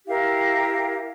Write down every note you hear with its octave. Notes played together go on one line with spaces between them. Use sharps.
E4 G4 A#4 F5